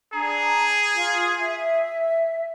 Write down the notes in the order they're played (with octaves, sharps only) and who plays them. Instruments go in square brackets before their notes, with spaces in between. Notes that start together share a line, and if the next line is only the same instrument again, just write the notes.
[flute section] D4 A#5 [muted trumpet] G#4
[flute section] F4
E5